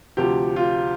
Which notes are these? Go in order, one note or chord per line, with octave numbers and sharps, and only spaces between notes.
D2 C3 F3 G4
F4